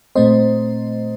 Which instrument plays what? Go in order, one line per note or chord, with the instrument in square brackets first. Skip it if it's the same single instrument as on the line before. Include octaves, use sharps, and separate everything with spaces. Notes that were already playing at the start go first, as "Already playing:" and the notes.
[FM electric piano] A#2 A3 C4 C5 D#5